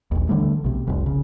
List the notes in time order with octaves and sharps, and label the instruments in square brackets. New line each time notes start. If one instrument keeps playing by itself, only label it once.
[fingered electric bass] A#1 D#2
D3 E3 G3 A3
B1 C3
F1 C2
C#3